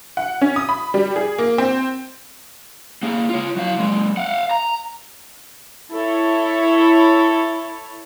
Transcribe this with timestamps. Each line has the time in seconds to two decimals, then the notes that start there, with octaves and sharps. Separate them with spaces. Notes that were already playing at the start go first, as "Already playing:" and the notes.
0.17 F#5
0.41 C#4
0.56 D#6
0.69 B5
0.94 G3
1.16 G#4
1.38 A#3
1.58 C4
3.03 A#3 G#4
3.30 F4 C#5
3.57 F#3 F5
3.78 F#3 G#3
4.17 F5 F#5
4.51 A#5
5.93 E4 A4 C#5